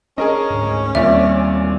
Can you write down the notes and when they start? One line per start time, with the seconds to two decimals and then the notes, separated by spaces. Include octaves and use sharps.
0.18 C#4 D4 G#4 A#4 D#5
0.50 D2 G#2
0.95 D#2 A#2 G3 C4 D5 E5